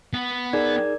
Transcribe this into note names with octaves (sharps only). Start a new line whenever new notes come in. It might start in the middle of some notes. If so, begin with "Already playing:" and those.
B3
D#4 G#4 A#4 D5 G#6